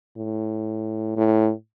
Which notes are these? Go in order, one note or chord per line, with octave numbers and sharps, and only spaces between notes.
A2
A2